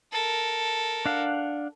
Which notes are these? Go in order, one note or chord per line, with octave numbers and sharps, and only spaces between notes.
A4 A#4
D4 F5 F#5